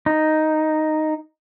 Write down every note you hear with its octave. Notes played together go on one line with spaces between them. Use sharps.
D#4